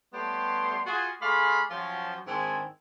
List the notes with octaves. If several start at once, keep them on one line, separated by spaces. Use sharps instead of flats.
G3 A3 B3 G4 C#5 C6
F4 F#4 G#4
A3 G#4 D5 F5 B5 C6
F3 F#3 C#4 F4 G4 C#5
G#2 D#3 C4 D4 E4 G#5